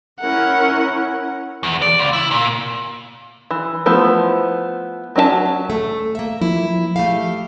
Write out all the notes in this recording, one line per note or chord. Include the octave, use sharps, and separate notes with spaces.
C#4 E4 A#4 F#5
E2
D5
C#2
E4
A#2
E3
F3 A3 B3 E4 C5
F#3 C#4 D4 G#5 A5
A3
A#3 E5
F3 E4
A3 G4 F5